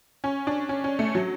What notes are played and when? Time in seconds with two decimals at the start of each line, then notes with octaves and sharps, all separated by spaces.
0.24 C#4
0.47 D4
0.69 C#4
0.84 C#4
0.99 A3
1.15 F#3